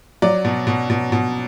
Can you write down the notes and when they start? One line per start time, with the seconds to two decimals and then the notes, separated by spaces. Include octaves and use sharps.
0.22 F#3 D5
0.45 B2
0.67 B2
0.90 B2
1.12 B2